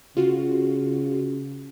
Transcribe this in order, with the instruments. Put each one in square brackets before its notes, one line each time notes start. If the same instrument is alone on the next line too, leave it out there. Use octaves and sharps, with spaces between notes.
[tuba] C#3 [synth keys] F4 F#4